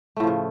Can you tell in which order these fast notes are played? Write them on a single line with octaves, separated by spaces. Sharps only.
A3 A2 F3 C#3